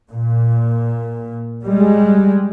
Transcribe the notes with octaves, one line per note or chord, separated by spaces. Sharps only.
A#2
G3 G#3